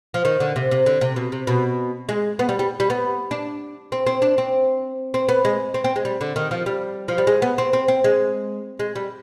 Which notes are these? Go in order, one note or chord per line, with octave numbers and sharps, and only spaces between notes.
F3
D#3
D3
C3
C3
D3
C3
B2
C3
B2
G#3
B3
G3
G3
G3
B3
D4
C4
C4
D4
C4
C4
B3
G#3
C4
C4
G#3
G3
D3
D#3
F3
G3
F3
G3
G#3
B3
C4
C4
C4
G#3
G#3
G3